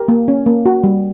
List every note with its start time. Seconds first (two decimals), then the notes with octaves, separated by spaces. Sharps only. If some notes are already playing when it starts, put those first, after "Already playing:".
Already playing: G4 A#4
0.08 A#3
0.28 C#4
0.46 A#3
0.66 F#4
0.84 G3